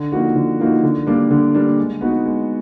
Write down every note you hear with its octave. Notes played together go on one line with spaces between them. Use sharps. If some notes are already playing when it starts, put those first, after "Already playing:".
Already playing: D3
F3 A#3 D#4 F#4
D3
F3 A#3 D#4 F#4
D3
G3 A#3 D4
D3
G3 A#3 D4
G#3
B3 D#4 F#4
G#3